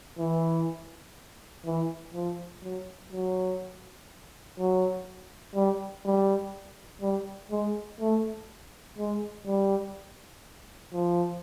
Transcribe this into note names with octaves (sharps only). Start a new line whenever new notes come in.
E3
E3
F3
F#3
F#3
F#3
G3
G3
G3
G#3
A3
G#3
G3
F3